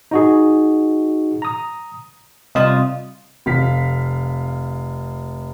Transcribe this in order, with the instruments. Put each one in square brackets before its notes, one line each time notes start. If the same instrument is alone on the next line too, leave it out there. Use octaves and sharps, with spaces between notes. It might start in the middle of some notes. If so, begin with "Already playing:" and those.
[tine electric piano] D#4 F#4 G#4
A#5 D#6
[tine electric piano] C3 G3 F4 [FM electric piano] D#5 D#6
[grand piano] F1 F5 B6